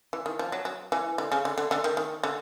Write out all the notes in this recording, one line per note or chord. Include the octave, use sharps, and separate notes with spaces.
E3
D#3
F3
F#3
F#3
E3
D3
C#3
D3
D3
D3
D#3
D#3
D3